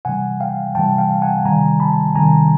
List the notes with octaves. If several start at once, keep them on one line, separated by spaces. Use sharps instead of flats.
C3 E3 G3 F#5 G#5
F5 G5
C3 E3 G3 G5 A5
F5 G5
F#5 G#5
C3 D#3 G3 G#5 A#5
A5 B5
C3 D#3 G3 G#5 A#5